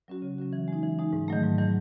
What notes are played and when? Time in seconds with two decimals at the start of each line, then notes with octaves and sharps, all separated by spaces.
0.08 F#3 C#4 F#4
0.22 C#3
0.38 F#3 C#4 F#4
0.53 E3
0.68 G#3 D#4
0.83 E3
0.99 G#3 D#4
1.13 G#2
1.28 D#3 F#3 A3
1.43 G#2
1.58 D#3 F#3 A3